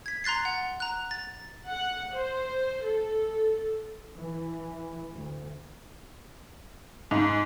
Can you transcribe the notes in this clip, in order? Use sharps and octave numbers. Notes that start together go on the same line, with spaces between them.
G#6 B6
A#5 C6 F#6 A6 C7
F#5
A#5 F#6
A6
F#5
C5
A4
E3
D2
G#2